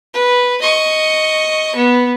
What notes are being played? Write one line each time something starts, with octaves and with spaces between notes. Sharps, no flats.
B4
D#5 C#6
B3